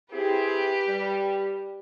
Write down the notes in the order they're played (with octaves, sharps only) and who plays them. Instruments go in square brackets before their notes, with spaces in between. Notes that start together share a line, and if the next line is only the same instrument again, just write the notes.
[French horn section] C4 E4 G#4 [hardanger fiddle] G4 B4
[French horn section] G3